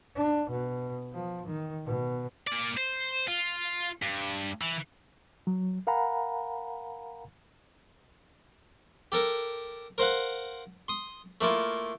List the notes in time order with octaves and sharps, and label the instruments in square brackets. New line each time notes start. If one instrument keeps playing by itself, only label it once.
[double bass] D4
B2
F3
D#3
B2
[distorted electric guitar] A#3 D5
C5
F4
G2
E3
[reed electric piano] F#3
A#4 F5 F#5 G#5 A#5 B5
[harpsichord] G4 A4 A#4
A#4 C5 F5 F#5
C6 D#6
A3 A#3 E4 F4